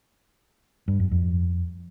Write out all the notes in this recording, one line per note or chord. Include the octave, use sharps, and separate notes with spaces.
G2
F#2
F2